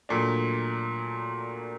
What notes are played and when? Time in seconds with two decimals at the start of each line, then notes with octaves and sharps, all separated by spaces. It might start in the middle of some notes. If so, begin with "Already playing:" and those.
0.09 A#2 F#3 A3 D4